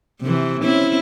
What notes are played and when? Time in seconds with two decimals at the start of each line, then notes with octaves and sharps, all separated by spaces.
0.22 C3 E3
0.63 C4 C#4 E4